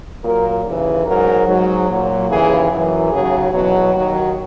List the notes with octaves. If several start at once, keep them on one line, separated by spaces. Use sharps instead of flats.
A#2 F#3 A#4
D#2 C#3 E3
G#2 F#3 A#4
G#2 F#3
A#2 F#3
D#2 C#3 E3 G#4
F#2 E3
D#2 C#3 F#3 G#4
E2 B2 F#3
D#2 D#3 F#3 F#4